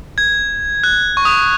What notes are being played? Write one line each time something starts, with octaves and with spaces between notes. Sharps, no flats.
G#6
F#6
C#6
D#6